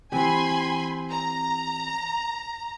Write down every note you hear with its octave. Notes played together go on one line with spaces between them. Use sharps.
E3 C4 G4 G#5 B5 C6
A#5